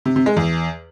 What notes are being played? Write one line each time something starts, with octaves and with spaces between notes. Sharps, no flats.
C3
C3
G#3
E2